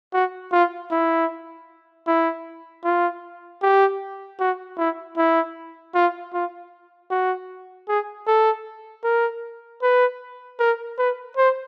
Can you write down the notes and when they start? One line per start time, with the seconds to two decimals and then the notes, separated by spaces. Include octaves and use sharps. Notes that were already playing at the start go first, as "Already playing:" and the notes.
0.13 F#4
0.52 F4
0.91 E4
2.07 E4
2.84 F4
3.62 G4
4.40 F#4
4.78 E4
5.17 E4
5.95 F4
6.34 F4
7.11 F#4
7.88 G#4
8.27 A4
9.04 A#4
9.82 B4
10.60 A#4
10.98 B4
11.37 C5